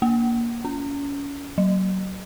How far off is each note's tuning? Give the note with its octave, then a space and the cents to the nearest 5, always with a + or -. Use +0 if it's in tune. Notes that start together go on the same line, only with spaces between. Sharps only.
A#3 +10
C#4 +30
F#3 +30